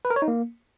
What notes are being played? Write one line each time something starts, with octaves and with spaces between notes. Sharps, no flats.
B4
A#4
C#5
D#4
A#3